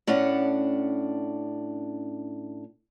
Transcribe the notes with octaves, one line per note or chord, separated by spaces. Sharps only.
A2 C#4 D4 F#5